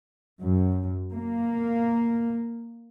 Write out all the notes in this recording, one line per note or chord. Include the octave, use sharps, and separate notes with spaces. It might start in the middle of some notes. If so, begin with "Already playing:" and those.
F#2
A#3